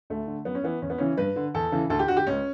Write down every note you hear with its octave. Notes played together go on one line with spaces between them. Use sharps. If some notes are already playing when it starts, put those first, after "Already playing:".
D2 A3
D3
F#2 B3
C#4
E3 B3
E2 C#4
B3
C#3 E3 C#4
G2 B4
D3
E2 A4
C#3 E3
D2 A4
G4
D3 F#4
G4
C#2 C#4